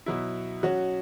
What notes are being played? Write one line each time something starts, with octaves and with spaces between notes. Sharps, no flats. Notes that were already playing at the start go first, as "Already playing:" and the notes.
B2 F#3 E4
F#3 C#4 F#4